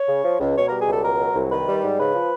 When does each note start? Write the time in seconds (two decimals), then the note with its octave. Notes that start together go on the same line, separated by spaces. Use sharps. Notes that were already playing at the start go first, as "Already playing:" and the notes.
Already playing: C#5
0.08 C#3
0.24 F3
0.40 C#2
0.56 B2 C#5
0.67 A#4
0.72 G3
0.80 G#4
0.88 C#2 A4
1.04 B2 A#4
1.20 F#3
1.35 C2
1.51 D#3 B4
1.68 G3
1.83 G#2
1.99 C#3 B4
2.14 F3